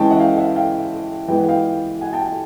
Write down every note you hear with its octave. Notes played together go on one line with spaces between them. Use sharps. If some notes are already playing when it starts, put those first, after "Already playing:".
Already playing: E3 G#3 C#4 G5 A5
E5 F#5
F5 G5
E5 F#5
F5 G5
E3 G#3 B3 G5
F#5
F5 G5
F#5 G#5
G5 A5
G5 A5